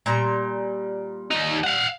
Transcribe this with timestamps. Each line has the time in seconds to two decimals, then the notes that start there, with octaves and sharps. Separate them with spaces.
0.06 A#2 G3 A#5
1.31 D#2 D#4
1.64 F5 F#5